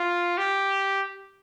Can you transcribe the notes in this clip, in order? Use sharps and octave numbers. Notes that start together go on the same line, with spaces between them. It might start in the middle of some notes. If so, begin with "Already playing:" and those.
Already playing: F4
G4